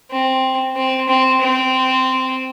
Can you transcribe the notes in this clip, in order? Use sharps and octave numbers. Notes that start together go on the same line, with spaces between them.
C4
C4
C4
C4